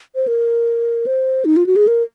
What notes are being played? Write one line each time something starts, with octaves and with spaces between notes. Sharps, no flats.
C5
A#4
C5
D#4
F4
F#4
G#4
A#4